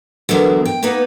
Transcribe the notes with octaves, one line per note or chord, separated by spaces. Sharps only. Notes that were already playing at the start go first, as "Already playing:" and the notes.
D3 E3 F#3 G#3 B3 A#4
G5
A#3 B3 D#4 B4